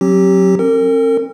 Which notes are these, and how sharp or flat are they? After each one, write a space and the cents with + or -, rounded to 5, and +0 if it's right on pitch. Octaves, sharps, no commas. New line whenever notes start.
F#3 +0 C4 +40 G4 -10
C4 +40 A#4 -40